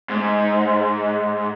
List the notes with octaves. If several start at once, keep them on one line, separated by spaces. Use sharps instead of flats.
G#2